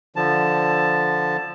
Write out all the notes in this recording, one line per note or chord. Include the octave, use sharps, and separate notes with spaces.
D3 F3 A5